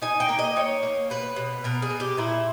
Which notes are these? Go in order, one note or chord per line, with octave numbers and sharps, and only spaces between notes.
D#4 G#5
G5
A#3
D#5
D#4 C#5
A#3
B2 B4
B2
B2 A#4
G#4
B2
G4
A#2 E4